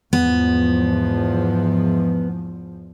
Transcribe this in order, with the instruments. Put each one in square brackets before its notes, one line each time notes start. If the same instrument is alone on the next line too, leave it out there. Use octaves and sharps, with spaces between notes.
[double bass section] E2 G#2 F3 [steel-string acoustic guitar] B3